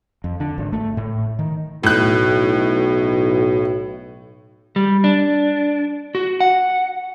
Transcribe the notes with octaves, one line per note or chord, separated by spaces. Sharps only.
F2
D3
G#1
A3
A2
D#3
B1 A2 F#6
G3
D4
F#4
F#5